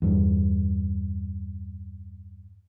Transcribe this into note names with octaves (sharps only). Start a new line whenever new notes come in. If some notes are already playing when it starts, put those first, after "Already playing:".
E2 G2